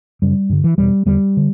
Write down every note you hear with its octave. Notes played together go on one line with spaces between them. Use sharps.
F#2 C#3 G3
G2 D3
E3
E2 B2 G3
E2 D3 G3
D3